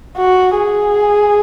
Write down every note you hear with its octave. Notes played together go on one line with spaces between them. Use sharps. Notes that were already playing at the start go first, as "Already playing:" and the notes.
F#4
G#4